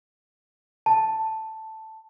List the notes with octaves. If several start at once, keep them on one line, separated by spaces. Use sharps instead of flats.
A5